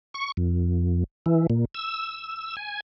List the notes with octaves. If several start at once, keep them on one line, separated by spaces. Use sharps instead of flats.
C#6
F2
E3
A#2
E6
G#5